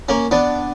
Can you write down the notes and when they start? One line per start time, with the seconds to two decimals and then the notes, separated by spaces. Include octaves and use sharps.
0.09 A#3 C#4
0.31 B3 D4